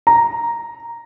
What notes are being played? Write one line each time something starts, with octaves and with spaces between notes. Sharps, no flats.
A#5